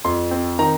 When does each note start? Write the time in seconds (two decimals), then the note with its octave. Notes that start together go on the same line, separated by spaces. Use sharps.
0.04 F2 C6
0.31 C4
0.58 D#3 A#5